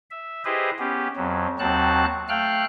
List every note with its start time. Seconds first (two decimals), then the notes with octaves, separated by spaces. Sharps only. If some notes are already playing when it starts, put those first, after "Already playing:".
0.10 E5
0.45 E4 G4 G#4 B4 C5 D#5
0.79 B3 C#4 G4
1.16 F2 F#3
1.59 D#2 F#3 C4 F#4 A5 F#6
2.29 A3 F5 G5 F6 F#6